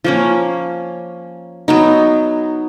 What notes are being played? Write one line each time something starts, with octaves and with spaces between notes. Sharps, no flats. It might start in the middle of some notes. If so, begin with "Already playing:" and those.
F3 A#3 C#4
F#3 B3 D#4